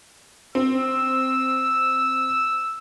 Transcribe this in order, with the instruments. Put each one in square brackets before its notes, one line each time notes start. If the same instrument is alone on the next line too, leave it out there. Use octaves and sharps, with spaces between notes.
[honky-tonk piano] C4 [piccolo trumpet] E6